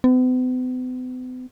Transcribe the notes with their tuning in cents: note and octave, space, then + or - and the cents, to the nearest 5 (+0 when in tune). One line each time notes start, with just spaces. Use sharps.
B3 +45